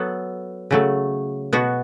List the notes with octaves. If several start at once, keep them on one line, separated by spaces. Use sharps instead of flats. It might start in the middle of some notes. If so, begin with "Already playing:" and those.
Already playing: F#3 B3 A4
C#3 F#3 A3
B2 B3 F#4